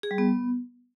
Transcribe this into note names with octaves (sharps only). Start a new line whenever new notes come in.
G#4
G3
B3